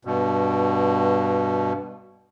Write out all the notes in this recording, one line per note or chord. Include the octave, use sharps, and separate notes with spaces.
G2 B2